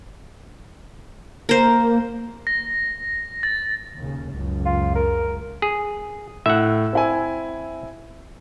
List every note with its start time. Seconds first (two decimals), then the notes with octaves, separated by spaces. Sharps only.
1.49 A#3 A#4 C5
2.47 A#6
3.43 A6
3.96 D#2 C#3
4.31 C#2 F#2
4.65 F4
4.95 A#4
5.62 G#4
6.46 A2 E5 F#5
6.93 C4 E4 G#5